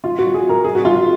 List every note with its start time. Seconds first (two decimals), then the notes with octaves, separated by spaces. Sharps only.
0.04 F4
0.19 F#4
0.34 G#4
0.49 A#4
0.64 G#4
0.75 F#4
0.85 F4